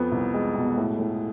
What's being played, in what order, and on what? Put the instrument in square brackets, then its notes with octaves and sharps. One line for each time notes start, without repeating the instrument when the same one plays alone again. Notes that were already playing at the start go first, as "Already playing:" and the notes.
Already playing: [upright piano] F2 B3
C2
G#3
B2
A2
A2